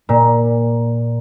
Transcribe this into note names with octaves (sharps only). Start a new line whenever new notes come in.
A#2